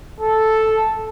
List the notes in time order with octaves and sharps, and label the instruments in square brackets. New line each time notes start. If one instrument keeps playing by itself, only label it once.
[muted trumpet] A4